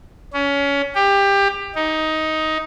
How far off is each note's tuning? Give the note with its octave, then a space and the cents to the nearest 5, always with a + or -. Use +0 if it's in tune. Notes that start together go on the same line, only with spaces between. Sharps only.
C#4 +25
G4 +20
D#4 +10